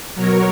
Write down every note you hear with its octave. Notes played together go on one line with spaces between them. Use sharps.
B2 F#3 A#4 C#5